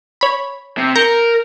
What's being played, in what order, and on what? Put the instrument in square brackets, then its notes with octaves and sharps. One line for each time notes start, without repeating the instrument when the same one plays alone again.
[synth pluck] C#5 B5
[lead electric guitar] C3
[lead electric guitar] A#4 [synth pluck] A#5 G6 C#7